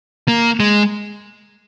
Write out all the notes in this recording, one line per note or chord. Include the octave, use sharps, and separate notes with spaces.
A#3
G#3